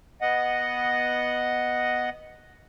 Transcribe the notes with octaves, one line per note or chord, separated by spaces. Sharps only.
B3 D#5 F#5